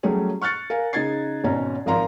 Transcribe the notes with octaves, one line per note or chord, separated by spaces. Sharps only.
F#3 G3 A3 C#4 G#4
C#6 F6 F#6 A6 C#7
A#4 F5 G#5
C#3 D#4 D#5 G#6 A6 C7
G#1 B2 C#4 A#5
G#1 F3 A#4 F5 A#5 C6